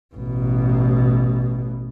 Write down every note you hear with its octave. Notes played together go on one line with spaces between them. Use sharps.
A1 B2